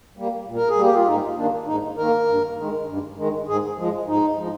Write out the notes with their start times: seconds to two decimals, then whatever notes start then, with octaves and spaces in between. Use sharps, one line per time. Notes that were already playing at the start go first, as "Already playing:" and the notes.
0.17 G3 A#3
0.47 A#2
0.56 A#4
0.69 G#4
0.77 G3 A#3 G4
0.95 F4
1.07 G#2 D#4
1.37 D#3 A#3 D4
1.67 G#2 D#4
1.97 D#3 A#3 A#4
2.28 G2
2.57 D#3 G#3
2.88 G2
3.18 D#3 G#3
3.48 G#2 G#4
3.78 F3 G#3
4.08 G#2 D#4
4.38 F3 G#3